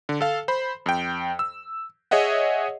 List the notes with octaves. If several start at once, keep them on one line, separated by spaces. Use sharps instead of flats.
D3
A4 F5
C5 B5
F2 G5
E6
G#4 C#5 D#5 E5 F#5